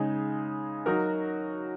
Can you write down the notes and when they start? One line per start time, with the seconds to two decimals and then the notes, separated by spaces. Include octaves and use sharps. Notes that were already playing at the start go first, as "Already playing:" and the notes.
Already playing: C#3 G#3 D#4
0.86 F#3 D#4 F#4 A#4